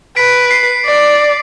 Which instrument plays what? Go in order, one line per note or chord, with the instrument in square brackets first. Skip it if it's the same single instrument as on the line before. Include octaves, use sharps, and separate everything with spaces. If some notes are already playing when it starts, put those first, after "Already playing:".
[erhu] B4 [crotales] B6 D7
[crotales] C7
[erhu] D5